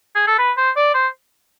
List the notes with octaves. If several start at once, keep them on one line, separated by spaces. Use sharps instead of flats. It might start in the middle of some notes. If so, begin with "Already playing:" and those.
G#4
A4
B4
C5
D5
C5